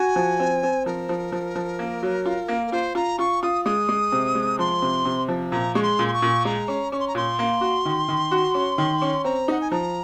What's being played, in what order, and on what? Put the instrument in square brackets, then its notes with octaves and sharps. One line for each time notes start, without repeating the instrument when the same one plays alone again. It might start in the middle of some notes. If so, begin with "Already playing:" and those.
Already playing: [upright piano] F#4 [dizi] G#5
[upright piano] F3
C4
C4
[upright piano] F3 [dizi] A#4
[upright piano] F3
F3
F3
A#3
F#3
F4
A#3
[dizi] A#4
[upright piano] F4 [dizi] C5
[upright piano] F4 [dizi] A#5
[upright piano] F4 [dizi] C#6
[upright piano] F4 [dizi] D#6
[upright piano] G#3 [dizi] D#6
[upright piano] G#3
C3
G#3
[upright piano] F3 [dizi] C6
[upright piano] C3
C3
F3
[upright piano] A#2 [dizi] A#5
[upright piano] G#3 [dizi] C#6
[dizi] C6
[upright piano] A#2
[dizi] C6
C#6
[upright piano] A#2
[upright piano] G#3 [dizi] A#5
[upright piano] C#4
[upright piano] C#4 [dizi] C#6
[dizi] C6
A#5
[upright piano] A#2 [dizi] C6
[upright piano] A#3
F#4
D#3
D#3
F#4
C#4
D#3
C#4
[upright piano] C4 [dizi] A#5
[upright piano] D#4 [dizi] F#5
[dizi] G#5
[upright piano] F3 [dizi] A#5